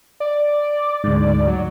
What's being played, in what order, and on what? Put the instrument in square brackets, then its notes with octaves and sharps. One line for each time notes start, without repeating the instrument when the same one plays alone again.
[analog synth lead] D5
[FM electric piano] D2 G#2
[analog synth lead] F#3